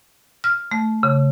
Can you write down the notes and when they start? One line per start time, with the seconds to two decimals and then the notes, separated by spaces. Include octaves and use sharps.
0.44 F6
0.71 A3
1.03 C#3